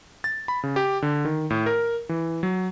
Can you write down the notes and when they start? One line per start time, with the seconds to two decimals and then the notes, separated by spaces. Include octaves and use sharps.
0.24 A6
0.48 B5
0.63 C#3
0.76 G4
1.02 D3
1.25 D#3
1.50 A2
1.66 A#4
2.09 E3
2.43 F#3